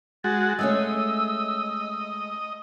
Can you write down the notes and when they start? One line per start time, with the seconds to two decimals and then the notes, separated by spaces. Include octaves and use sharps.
0.24 G#3 F#4 A6
0.59 G#3 A3 C#4 D#5 E6